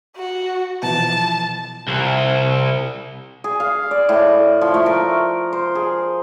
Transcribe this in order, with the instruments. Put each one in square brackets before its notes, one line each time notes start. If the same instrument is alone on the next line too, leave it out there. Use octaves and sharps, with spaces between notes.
[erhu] F#4
[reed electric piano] B2 E3 F3 [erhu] A5
[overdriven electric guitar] C2
[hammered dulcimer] G#4
F5
D5
A2
F3
A3
A#4
C5
G#4